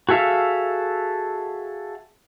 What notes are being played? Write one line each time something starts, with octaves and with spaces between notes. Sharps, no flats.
F#4 G#4 A4 E5 F5